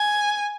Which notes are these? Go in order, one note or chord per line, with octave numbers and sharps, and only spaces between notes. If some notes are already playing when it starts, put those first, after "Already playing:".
Already playing: G#5